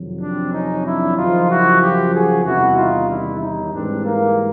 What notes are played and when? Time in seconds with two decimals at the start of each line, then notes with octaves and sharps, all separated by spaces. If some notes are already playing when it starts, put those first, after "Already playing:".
Already playing: F2 C3 D#3 F#3
0.21 C4 D4
0.53 C#4 D#4
0.85 D4 E4
1.17 F#2 C#3 F3 D#4 F4
1.50 E4 F#4
1.81 F4 G4
2.14 F#4 G#4
2.44 E2 C3 D#3 G3 E4 F#4
2.76 D#4 F4
3.09 D4 E4
3.40 C#4 D#4
3.72 G#2 E3 G3 C4 D4
4.05 A#3